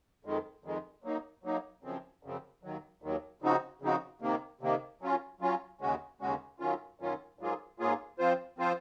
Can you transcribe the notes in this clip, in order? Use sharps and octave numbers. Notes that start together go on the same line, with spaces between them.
F2 D#3 G#3
F2 D#3 G#3
F#3 A#3 D#4
F#3 A#3 D#4
F#2 C#3 F3 C4
F#2 C#3 F3 C4
D#2 D#3 F#3
D#2 D#3 F#3
C#3 F3 C4 D#4 F#4
C#3 F3 C4 D#4 F#4
C3 D#3 A#3
C3 D#3 A#3
F#3 C#4 F4
F#3 C#4 F4
D#2 C#3 G#3 C#4 F#4
D#2 C#3 G#3 C#4 F#4
F#2 D#3 F#3 C#4 F4
F#2 D#3 F#3 C#4 F4
G#2 F#3 A#3 F4 G#4
G#2 F#3 A#3 F4 G#4
F3 C4 F4 C5
F3 C4 F4 C5